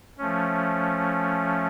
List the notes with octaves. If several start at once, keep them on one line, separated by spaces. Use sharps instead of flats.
F3 A3 C#4